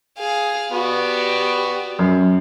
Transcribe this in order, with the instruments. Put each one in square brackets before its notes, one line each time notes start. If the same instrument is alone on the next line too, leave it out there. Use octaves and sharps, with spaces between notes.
[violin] G#4 F5
[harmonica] B3 F#4 [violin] G4 D5
[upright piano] F#2